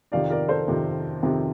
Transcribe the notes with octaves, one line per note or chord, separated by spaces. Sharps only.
F2 C3 D#3 D5 F5
A#4 D5
A4 C5
F2 C3 D#3
F2 C3 D#3